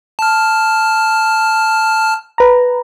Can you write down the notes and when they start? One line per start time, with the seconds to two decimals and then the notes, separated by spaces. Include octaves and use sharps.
0.19 A5 F6
2.38 B4 A#5